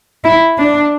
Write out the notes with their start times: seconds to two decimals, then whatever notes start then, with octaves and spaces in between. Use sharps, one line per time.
0.24 E4
0.58 D4